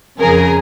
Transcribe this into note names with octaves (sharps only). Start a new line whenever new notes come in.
F2 C#3 F3 G#4 A#4